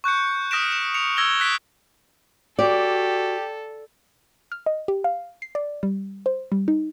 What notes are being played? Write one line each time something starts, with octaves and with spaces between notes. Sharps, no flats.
C#6 F#6 G6 C#7
D#6 F6 A#6 B6 D7 E7
E7
C#7 F7
E6 G#6 A#6 C#7 G7
F#6 B6 D7
F#4 G4 A4 D5
F6
D#5
G4
F5
C7
D5
G3
C5
G3
D#4